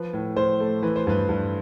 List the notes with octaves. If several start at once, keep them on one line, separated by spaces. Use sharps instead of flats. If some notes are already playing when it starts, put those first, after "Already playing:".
Already playing: F3 B4
A2
A2 C5
A3
E3 B4
C5
G2 B4
G2